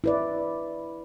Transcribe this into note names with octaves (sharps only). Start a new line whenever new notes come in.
E4 B4 D5